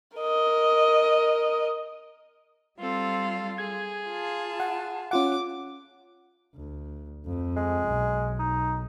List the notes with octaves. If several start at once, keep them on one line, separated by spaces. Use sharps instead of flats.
A#4 D#5
G3 C4 F4 A4
G#4 G#6
F4 A5
F#5
C#4 F4 F#5 D6
D2
F2
G#3
B1
D#4